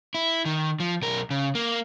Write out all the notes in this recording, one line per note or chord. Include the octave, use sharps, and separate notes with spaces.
E4
D#3
F3
B1 A#4
C#3
A#3